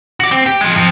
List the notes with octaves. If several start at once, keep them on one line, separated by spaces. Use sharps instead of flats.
F#4 D5
C4
G4
F3 G#3
F2 F3